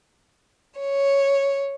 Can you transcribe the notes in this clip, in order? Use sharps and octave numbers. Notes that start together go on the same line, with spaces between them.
C#5